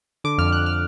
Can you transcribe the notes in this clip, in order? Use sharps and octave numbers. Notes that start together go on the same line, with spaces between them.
D3 D6
F2 F6
F2 F#6
F6